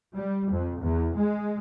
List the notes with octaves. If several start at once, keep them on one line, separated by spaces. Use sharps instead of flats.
G3
F2
E2
G#3